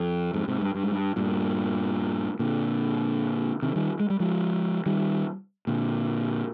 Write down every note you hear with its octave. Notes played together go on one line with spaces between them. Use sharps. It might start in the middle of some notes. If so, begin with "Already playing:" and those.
Already playing: F2
F2 G#2
G#2 C3
G2
G2
G#2
G2
G2 A#2
A#2 D3
C3 D#3
D#3 G3
G#3
G3
F3 G#3
D#3 G3
A#2 D3